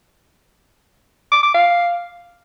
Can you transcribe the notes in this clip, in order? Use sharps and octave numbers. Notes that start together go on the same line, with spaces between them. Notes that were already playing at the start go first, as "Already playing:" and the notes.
D6
D6
F5